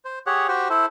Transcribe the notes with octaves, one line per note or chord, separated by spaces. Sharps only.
C5
G4 G#4 C#5 F#5
F#4 G4 C5 G5
E4 A4 C5